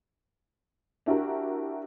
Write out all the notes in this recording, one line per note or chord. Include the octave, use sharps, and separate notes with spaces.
D4 E4 F#4 G4 A#4